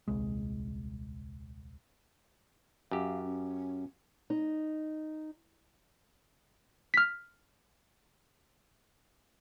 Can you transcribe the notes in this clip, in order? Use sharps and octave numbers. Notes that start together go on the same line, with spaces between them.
D#1 C2 G#3
F#2 G4 F5
C#4
D#4
F6 B6